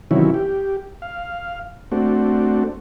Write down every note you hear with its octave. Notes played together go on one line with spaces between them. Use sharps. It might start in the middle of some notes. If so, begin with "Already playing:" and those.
C3 D#3 E3 F#3 C#4 E4
G4
F5
A3 C4 D4 F#4